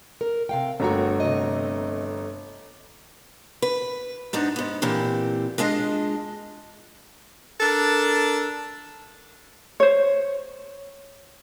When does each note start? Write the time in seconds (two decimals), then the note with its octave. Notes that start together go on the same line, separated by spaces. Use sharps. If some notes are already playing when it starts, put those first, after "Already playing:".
0.21 A#4
0.49 C3 F5 G5
0.80 G1 A3 A#3 F#4 A#5
1.20 C3 D#5
3.62 B4
4.33 G#2 B3 D4 D#4
4.56 G#2 B3
4.82 A#2 E3 C4 G4
5.58 G#3 D4 F4 D#5
7.60 D4 A4 A#4
9.80 C5 C#5